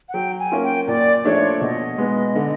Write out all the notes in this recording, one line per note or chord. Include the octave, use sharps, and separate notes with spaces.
F#5
F#3 G5
G#5
A#3 C#4 F4
G5
A#2 D5
F3 A3 D4 C#5
B2 D#5
G#3 B3
D3